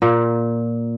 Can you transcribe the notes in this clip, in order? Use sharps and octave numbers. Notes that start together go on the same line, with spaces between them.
A#2